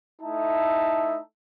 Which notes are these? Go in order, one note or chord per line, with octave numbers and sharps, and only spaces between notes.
A3 D#4 E4 E5 A5